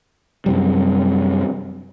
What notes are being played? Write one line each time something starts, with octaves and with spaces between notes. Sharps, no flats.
F#2 C3 G3